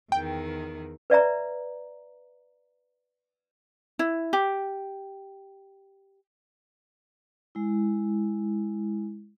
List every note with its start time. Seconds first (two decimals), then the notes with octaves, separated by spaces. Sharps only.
0.12 E2 D#3 G5
1.10 B4 D5 E5 A#5
3.99 E4
4.33 G4
7.55 G#3 E4